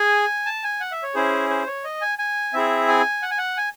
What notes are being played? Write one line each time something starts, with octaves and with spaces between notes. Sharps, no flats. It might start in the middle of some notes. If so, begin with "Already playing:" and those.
Already playing: G#4 G#5
A5
G#5
F#5
E5
C#5
C#4 E4 G#4 C5
C5
C#5
D#5
G#5
G#5
C4 E4 G#4 E5
G#5
F#5
G#5
F#5
G#5